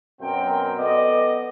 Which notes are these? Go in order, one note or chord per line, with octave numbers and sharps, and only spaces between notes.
F#2 B2 C4 A#4 G5
B3 A4 D5 D#5